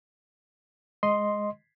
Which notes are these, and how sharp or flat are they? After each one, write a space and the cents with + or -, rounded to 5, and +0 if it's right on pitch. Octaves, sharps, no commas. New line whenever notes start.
G#3 +0 D#5 +0 C6 +0